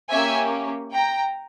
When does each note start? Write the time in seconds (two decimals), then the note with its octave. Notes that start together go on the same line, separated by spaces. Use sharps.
0.10 A#3 C#4 G4 E5 G#5
0.93 G5 A#5